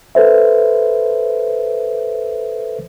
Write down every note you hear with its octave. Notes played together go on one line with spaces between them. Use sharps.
A4 B4 C5 E5